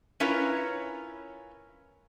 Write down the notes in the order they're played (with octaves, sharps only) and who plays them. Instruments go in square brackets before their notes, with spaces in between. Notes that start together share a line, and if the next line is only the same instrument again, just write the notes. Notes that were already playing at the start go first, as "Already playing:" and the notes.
[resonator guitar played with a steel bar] C#4 E4 F4 A#4 B4 C#5